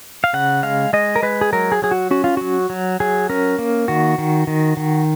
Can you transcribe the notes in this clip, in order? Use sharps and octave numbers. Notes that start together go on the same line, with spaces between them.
F5
C#3 F#5
G#3 F5
G#3 D#5
A#4
G#3 B4
G#4
F#3 A#4
G#4
F#3 G#4
F#4
C#4 F#4
F4
F#3 F#4
F#3
F#3 G#4
C#4 A#4
A#3
D#3 F#4
D#3
D#3
D#3